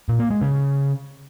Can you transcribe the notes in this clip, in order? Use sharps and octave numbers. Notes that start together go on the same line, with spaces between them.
A#2
A#3
G#3
C#3